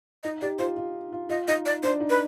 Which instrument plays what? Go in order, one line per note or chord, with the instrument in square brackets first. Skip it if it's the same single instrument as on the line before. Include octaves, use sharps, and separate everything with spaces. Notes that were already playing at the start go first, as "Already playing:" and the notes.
[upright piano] D#4 [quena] D#5
[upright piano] G4 [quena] D5
[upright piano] F4 [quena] C5
[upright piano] F4
F4
[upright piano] F4 [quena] D#5
[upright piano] D#4 [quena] D#5
[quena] D5
[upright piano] D4 [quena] C5
[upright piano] D#4
[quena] B4